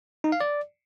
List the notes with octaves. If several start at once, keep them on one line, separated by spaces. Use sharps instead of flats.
D#4
F5
D5